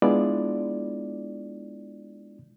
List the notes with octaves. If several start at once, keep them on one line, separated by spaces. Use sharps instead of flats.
G#3 B3 D4 E4 F4 D5